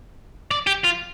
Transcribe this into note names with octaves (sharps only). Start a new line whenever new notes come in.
D5
G4
F4